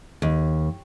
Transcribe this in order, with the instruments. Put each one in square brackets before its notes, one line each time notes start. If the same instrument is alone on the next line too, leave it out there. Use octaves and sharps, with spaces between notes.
[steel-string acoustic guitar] D#2